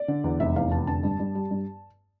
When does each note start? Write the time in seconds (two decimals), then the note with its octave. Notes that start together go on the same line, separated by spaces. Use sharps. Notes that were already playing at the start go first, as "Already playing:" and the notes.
Already playing: D5
0.08 D3
0.24 E2
0.40 F1 E5
0.56 E2 F5
0.71 F1 A5
0.87 D3 A5
1.03 G2
1.19 G2
1.35 G3
1.51 G2